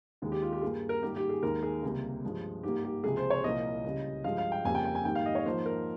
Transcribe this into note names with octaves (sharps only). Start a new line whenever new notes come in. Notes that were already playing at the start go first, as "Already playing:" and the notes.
D#2 D#3 G#3
G4
F4
G4
G2 G3 A#3 G#4
A#4
G#2 D#3 G3 A#3 G4
G4
G#4
D#2 D#3 G#3 A#4
G#4
C#2 C3 G3 A#3
G2 F3 G#3
G#2 G3 A#3 G4
G4
C#2 C3 F3 G#3 G#4
C5
C#5
C2 A#2 F3 A#3 D#5
C#2 C#3 G3
G2 F3 G#3 F5
F5
G5
F2 C#3 G3 A#3 G#5
G5
G5
G#5
G#2 D#3 G3 A#3 G5
F5
D#5
C#5
G#2 F3 A#3 C5
A#4